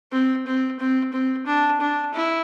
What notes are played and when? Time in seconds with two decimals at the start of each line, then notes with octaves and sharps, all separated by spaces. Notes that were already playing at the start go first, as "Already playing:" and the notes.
0.12 C4
0.47 C4
0.79 C4
1.13 C4
1.46 D4
1.81 D4
2.14 E4